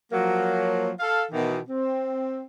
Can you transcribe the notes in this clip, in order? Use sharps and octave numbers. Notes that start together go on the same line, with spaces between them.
F3 F#3 A#3
A4 F5
B2 D#3 E3
C4